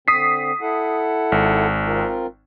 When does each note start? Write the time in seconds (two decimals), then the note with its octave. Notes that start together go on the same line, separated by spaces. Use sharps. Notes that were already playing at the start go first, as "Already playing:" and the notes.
0.08 D3 C4 D#6 B6 C7
0.61 E4 A4 F#5
1.32 G#1
1.86 C4 F4 A#4